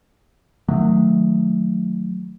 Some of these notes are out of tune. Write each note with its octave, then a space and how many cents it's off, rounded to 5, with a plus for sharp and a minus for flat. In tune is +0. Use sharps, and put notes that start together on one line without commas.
D#3 +0 F#3 -20 A3 +0